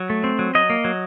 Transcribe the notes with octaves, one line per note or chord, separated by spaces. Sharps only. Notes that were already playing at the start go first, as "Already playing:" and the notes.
Already playing: F#3
A3
C4
F#3
F#3 D#5
A#3
F#3